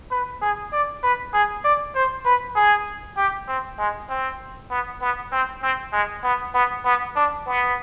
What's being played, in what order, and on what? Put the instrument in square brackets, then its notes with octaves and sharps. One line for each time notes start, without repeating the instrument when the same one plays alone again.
[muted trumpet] B4
G#4
D5
B4
G#4
D5
C5
B4
G#4
G4
C4
G#3
C4
B3
B3
C4
C4
G#3
B3
B3
B3
D4
B3